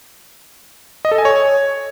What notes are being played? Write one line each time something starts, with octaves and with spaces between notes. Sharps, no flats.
D#5
A4
G#5
C#5